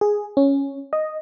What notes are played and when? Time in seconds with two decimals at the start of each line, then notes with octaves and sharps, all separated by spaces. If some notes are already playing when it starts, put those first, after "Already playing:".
0.01 G#4
0.37 C#4
0.93 D#5